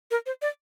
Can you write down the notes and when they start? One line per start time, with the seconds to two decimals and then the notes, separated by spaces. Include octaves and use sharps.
0.11 A#4
0.26 C5
0.42 D5